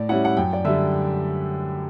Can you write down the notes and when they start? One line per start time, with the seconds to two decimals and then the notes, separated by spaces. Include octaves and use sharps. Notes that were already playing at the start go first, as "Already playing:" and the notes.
Already playing: A2 D5
0.09 G3 C#4 E4 F#5
0.25 F#5
0.37 F#2 G5
0.53 D5
0.64 D3 G3 E5